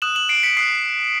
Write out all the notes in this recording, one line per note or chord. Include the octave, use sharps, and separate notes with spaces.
D#6 F#6 E7 F#7
E7 F#7
C7 D7
B6 C#7
D#6 F#6 C7